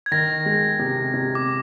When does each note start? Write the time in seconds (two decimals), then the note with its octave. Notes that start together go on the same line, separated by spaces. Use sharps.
0.06 G#6
0.11 D#3 A#6
0.46 G#3
0.79 C3
1.14 C3
1.35 D6